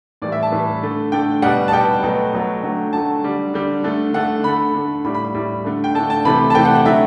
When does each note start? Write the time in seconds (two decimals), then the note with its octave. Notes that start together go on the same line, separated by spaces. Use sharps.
0.22 A2 E3 G3 D5
0.32 E5
0.43 A5
0.52 A2 E3 G3
0.83 D3 A3
1.12 D3 A3 G5
1.42 B2 G3 F#5
1.68 A5
1.72 B2 G3 G5
2.03 B2 F#3 A3
2.33 B2 F#3 A3
2.63 D3 F#3 A3
2.93 D3 F#3 A3 A5
3.24 D3 G3
3.54 D3 G3
3.84 D3 A3
4.14 D3 A3 F#5
4.44 D3 A3 B5
4.74 D3 A3
5.04 A2 G3 B5
5.15 B5
5.25 B5
5.34 A2 G3
5.64 D3 A3
5.84 G5
5.95 D3 A3 A5
6.10 A5
6.25 C3 E3 A3 B5
6.50 A5
6.55 C3 E3 A3 G5
6.65 F#5
6.75 F#5
6.85 D3 F#3 A3 E5